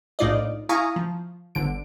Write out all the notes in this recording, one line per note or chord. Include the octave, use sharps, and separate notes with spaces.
A#1 A2 D#4 F4 D5 D#5
E4 F5 G#5 A#5 C#6 D#6
F3
G1 D3 D7